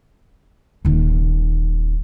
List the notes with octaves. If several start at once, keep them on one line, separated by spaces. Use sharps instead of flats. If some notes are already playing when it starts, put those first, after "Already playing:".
D#1 D#3